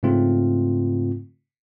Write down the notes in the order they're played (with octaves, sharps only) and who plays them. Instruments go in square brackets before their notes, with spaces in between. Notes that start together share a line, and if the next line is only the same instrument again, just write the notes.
[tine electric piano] G#2 C#3 A3 C4 F4